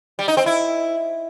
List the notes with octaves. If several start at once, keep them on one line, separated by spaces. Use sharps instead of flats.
G3
D#4
C4
E4